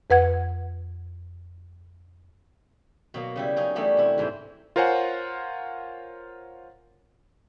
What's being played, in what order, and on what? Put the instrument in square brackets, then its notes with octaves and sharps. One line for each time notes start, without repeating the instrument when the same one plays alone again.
[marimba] F2 B4 F#5 G#6
[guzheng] B2 F#3 A#3
C#3 G3 E4
F#3 C#4 D#4 G#4
E3 G3 A3 B3 D4 F#4
C3 E4
E2 G#2 C4
[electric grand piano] F4 A#4 C5 C#5 F#5 G#5